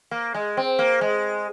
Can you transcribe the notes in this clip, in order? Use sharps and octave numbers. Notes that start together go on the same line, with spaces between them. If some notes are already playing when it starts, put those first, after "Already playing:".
A#3
G#3
C4
A#3
G#3